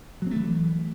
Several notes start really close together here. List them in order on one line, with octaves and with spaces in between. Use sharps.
F#3 C4 A3 E3